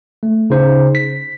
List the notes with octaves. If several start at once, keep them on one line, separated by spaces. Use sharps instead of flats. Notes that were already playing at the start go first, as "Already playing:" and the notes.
A3
C#3 D#4 C5
B6